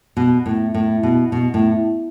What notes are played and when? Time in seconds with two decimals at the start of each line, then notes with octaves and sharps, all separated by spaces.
0.17 B2
0.46 A2
0.74 A2
1.03 B2
1.32 B2
1.54 A2